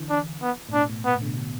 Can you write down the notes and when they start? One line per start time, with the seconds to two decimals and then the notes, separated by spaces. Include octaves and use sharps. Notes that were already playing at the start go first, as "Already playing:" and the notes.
Already playing: D3 E3
0.10 D4
0.42 B3
0.69 A2
0.73 B2 D4
0.90 A2
1.05 B2 B3
1.16 A2
1.22 D3
1.27 B2
1.37 B2